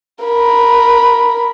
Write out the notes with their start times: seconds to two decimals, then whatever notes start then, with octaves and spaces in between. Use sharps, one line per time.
0.25 A#4 B5